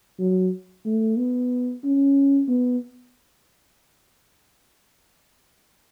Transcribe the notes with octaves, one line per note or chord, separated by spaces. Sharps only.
F#3
A3
B3
C#4
B3